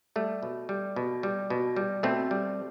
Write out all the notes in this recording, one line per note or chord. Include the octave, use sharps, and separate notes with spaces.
G3 A3
B2
G3
B2
G3
B2
G3
B2 A3 C4
G3